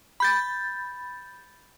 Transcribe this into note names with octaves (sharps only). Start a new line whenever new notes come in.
B5 G6 A6